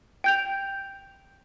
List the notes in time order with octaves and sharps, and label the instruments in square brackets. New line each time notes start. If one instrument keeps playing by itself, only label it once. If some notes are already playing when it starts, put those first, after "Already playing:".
[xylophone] G5 G6 F7